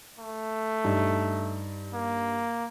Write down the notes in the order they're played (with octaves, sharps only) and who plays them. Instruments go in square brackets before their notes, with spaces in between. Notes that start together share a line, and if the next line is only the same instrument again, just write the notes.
[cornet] A3
[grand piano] G2 D#4
[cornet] A#3